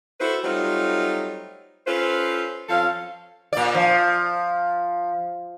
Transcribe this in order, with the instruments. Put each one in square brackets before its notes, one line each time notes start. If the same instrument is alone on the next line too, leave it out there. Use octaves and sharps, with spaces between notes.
[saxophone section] E4 F#4 A4 B4 C5
F#3 G3 A3 C4 D#4 F4
C#4 F4 A4 B4 C5
F2 F3 C#4 A4 F5
[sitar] A#2 D5
F3